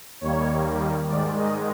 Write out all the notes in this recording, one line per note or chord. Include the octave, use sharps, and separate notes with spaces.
D#2 D#3 G3 A#3 C#5
G#2 D#3 G#3 D5
D#5